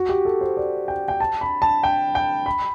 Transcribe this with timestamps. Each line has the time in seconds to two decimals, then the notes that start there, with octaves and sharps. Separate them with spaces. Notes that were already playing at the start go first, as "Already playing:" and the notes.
Already playing: F#4
0.09 G4
0.25 A4
0.41 C5
0.57 D5
0.88 G5
1.08 G5
1.20 A5
1.41 B5
1.62 A5
1.83 G5
2.15 G5
2.46 B5